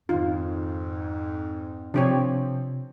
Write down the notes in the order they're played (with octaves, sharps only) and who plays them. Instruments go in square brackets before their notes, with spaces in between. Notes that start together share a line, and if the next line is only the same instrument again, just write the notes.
[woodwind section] F2 G#2 [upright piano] D#3 [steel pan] F4
[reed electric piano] C3 [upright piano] F3 C4 [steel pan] D4 G4 C#5